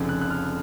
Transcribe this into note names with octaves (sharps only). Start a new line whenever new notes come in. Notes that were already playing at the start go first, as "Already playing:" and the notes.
Already playing: F1 F2 C#3
F#6
F#6
F6